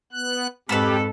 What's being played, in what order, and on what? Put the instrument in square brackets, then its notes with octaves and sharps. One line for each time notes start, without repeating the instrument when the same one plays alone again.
[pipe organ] B3 F#6
[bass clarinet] F2 [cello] G#2 A4 [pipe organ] G4 [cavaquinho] B4 A5 B5